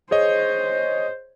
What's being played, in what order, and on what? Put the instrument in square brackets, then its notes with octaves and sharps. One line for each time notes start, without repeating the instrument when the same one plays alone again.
[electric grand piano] G#4 C#5 D#5 [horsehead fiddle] C5